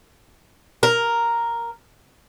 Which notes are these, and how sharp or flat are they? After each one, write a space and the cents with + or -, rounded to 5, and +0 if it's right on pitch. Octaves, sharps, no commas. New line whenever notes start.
A#4 +0